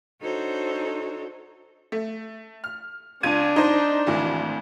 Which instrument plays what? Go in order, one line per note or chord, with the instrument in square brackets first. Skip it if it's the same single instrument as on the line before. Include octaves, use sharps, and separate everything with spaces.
[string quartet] D4 D#4 F#4 A4 C5 C#5
[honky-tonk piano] A3
F6
[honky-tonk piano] C#2 G#6 D#7 [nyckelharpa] D4
[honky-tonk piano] D#4 C5
G#1 D2 E3